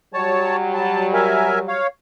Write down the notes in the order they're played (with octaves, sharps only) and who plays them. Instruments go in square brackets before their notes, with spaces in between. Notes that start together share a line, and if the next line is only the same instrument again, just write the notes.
[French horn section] F#3 G3 [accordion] C#5 A5
[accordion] A5
A#4 E5 G#5
C#5 F5